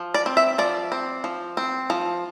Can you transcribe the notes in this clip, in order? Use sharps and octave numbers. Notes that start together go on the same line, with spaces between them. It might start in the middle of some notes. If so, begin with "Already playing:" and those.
Already playing: F3
D5
C4
E5
F3 D5
C4
F3
C4
F3